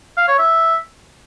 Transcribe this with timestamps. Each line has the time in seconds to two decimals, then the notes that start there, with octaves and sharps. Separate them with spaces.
0.17 F5
0.28 C#5
0.38 E5